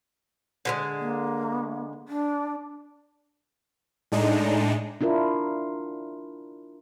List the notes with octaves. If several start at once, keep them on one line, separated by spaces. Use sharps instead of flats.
D3 F3 G#3
A#3
D4
A2 G#3 D4 D#4
D4 E4 F4 A#4